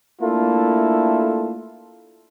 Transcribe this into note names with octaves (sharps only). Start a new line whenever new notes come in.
A3 A#3 D4 E4 F4 A4